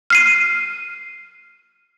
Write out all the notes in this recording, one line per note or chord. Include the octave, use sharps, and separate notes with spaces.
F6 C7 D#7